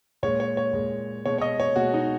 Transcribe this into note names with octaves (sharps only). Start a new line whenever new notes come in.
A#2 G#3 C#5
C#5
C#5
A#2 G#3
B2 G#3 C#5
C#5
D#5
C#5
B2 G#3 F#4
D#4